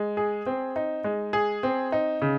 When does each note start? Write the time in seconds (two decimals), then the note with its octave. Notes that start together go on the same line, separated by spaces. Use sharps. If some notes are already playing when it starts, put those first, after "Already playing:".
Already playing: G#3
0.17 G#4
0.46 C4
0.76 D#4
1.04 G#3
1.33 G#4
1.63 C4
1.92 D#4
2.22 C#3